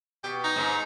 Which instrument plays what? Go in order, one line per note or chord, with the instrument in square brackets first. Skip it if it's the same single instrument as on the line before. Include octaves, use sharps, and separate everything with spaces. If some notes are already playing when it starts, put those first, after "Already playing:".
[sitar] B2 [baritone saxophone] G4
[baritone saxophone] D#4
[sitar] G#2